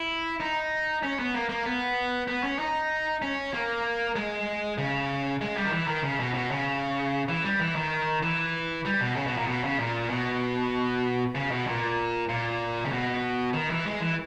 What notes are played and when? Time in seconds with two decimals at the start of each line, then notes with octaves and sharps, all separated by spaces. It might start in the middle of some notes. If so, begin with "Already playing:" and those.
Already playing: E4
0.40 D#4
1.03 C#4
1.19 B3
1.34 A#3
1.49 A#3
1.66 B3
2.28 B3
2.43 C#4
2.59 D#4
3.22 C#4
3.54 A#3
4.16 G#3
4.78 C#3
5.41 G#3
5.57 G3
5.65 D#3
5.72 E3
5.87 D#3
6.03 C#3
6.20 B2
6.34 B2
6.51 C#3
7.29 E3
7.44 G3
7.59 E3
7.75 D#3
8.23 E3
8.85 G3
9.00 B2
9.16 C#3
9.27 B2
9.37 A#2
9.47 B2
9.64 C#3
9.79 A#2
10.10 B2
11.35 C#3
11.51 B2
11.67 A#2
12.29 A#2
12.85 C#3
12.92 B2
13.54 D#3
13.70 E3
13.85 G#3
14.01 E3